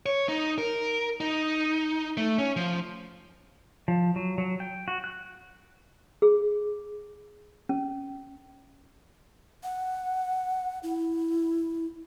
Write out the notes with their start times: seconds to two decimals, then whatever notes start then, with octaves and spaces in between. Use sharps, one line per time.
0.06 C#5
0.29 D#4
0.58 A#4
1.20 D#4
2.17 A3
2.38 C#4
2.56 F3
3.88 F3
4.16 F#3
4.38 F#3
4.60 G5
4.88 F#4
5.04 F#6
6.22 G#4
7.69 C#4
9.63 F#5
10.83 E4